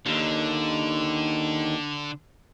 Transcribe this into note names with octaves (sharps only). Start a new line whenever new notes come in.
D#2 D3